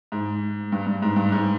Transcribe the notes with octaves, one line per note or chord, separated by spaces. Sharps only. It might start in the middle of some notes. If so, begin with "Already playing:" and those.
G#2
G2
G2
G#2
G2
G#2